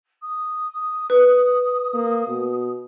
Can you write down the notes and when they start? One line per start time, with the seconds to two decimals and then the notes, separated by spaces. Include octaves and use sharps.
0.22 D#6
1.10 B4
1.93 A#3
2.27 B2